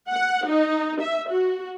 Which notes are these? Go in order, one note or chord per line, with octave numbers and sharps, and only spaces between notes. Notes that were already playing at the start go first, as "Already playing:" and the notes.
F#5
D#4
E5
F#4